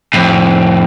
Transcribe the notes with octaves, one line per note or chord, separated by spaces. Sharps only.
F2 A2